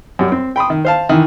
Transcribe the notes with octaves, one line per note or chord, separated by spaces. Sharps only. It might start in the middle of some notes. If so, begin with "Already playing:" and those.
F#2 G3
C4
G5 B5 C6 D#6
D#3
C5 F5 A5
D#3 E3